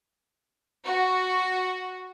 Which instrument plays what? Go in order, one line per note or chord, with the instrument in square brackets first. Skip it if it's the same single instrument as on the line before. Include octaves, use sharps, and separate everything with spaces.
[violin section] F#4